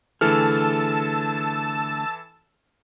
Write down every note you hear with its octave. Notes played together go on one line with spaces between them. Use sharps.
D3 E3 A3 G#4 A4 A5 E6 F6